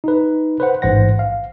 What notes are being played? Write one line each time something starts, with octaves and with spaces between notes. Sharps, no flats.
D#4 B4
B4 C5 F#5
A1 G#2 C5 F#5 A#6
F5